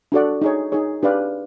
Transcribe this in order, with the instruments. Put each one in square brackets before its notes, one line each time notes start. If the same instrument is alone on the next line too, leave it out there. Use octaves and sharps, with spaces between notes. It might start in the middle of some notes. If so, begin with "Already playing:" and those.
[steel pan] D4 F#4 A4 D5 F#5
D#4 G#4 C#5
D#4 G#4 C#5
D4 G4 B4 D5 F5